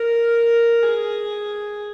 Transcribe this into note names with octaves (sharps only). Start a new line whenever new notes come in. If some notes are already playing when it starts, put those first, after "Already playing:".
Already playing: A#4
G#4